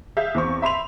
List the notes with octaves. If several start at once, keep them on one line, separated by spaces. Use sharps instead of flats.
G#4 E5 F5 G6
E2 C4 C#6
E5 B5 C6 F7